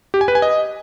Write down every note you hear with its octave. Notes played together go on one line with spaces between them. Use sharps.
G4
G#5
B4
G#5
D#5